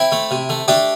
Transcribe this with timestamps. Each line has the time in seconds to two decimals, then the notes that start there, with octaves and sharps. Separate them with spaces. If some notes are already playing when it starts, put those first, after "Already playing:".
Already playing: C4 E4
0.12 A3
0.31 C3
0.49 A3
0.68 A3 D4 G4